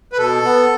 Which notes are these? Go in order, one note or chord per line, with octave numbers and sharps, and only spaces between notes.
B4
B2 A4
B3